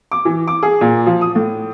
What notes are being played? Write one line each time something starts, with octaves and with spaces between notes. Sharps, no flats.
D6
E3
D6
G#4
A#2
F3
D#6
A2